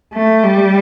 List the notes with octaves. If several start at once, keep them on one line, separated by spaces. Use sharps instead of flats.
A3
G3